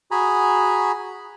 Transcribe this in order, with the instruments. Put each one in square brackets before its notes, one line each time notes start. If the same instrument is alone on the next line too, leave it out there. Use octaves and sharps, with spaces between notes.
[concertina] F#4 G#4 G#5 A#5 B5